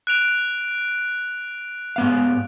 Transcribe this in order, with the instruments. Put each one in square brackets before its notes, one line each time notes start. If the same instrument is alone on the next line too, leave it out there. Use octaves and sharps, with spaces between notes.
[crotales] F#6 D7 F7
[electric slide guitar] G#2 B3 F5